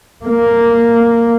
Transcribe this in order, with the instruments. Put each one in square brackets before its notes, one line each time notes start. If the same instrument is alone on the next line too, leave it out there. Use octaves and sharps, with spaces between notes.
[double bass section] A#3